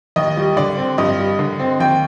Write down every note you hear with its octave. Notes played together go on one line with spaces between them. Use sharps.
D#2 D#5
G3
D3 D5
C4
G2 D#5
G3
D3
C4
D#2 G5